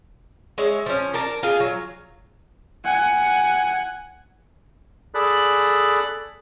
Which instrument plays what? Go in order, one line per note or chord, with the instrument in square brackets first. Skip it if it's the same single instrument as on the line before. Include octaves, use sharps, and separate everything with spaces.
[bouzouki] G#3 C#5 E5
F3 C#4
D4 A#4 A5
F4 G#4
F#3
[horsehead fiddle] F#5 G#5
[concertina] G#4 A4 D5 B5 F#6